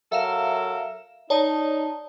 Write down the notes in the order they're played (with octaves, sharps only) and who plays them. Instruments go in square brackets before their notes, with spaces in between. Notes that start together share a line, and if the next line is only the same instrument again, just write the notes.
[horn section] F#3 A4 A#4 [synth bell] E5 F5 E7
[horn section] D#4 [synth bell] C#5 D5 A5